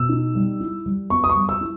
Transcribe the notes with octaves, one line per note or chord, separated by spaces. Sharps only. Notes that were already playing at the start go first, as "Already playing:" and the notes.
Already playing: B2 E6
D#4
G3
E4
G3
B3 C#6
D#6
C#6
G3
E6
E4